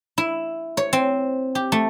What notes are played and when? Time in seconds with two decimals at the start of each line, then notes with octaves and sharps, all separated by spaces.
0.18 E4
0.77 C#5
0.93 C4
1.55 G4
1.72 A3